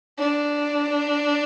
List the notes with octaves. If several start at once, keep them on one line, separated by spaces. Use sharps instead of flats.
D4